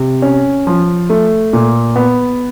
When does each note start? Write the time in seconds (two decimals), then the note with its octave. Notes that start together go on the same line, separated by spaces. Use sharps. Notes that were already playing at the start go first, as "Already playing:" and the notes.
Already playing: C3
0.22 C#4
0.67 F3
1.10 A3
1.53 A#2
1.96 B3